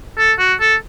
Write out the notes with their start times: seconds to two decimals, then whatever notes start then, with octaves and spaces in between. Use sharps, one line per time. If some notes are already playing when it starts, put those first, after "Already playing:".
0.18 A4
0.39 F#4
0.61 A4